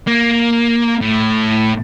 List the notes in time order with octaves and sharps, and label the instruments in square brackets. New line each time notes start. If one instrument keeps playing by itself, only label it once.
[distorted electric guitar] A#3
A2